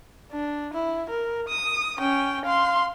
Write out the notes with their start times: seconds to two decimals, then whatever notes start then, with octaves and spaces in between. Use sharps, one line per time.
0.31 D4
0.73 E4
1.10 A#4
1.48 D#6
1.99 C#4 G5
2.45 F5 C6